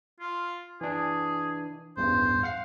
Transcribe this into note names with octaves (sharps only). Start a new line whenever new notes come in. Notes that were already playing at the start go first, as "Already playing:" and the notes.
F4
E3 D4 G#4
A1 E2 G2 C5
F5 F#5 C7